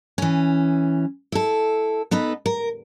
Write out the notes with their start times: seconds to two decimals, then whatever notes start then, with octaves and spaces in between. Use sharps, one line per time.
0.18 E3 C#4
1.32 E4 A4
2.11 B3 D#4 A4 B4
2.46 A#4